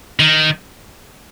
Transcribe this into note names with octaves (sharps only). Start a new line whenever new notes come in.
D#3